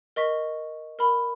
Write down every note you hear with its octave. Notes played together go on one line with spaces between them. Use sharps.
A#4 D#5 C#6 B6
A#4 B5